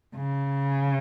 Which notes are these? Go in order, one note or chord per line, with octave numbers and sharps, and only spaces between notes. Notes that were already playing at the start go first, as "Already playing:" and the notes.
C#3